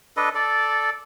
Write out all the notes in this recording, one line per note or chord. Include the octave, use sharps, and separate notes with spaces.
D4 A4 B4 D#5
A4 D5